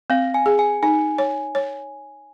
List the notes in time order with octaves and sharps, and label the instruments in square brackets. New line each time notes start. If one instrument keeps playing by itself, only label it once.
[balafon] C4 [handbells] F5
[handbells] G#5
[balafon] G#4
[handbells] G#5
[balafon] D#4 [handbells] G#5
[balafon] C#5
C#5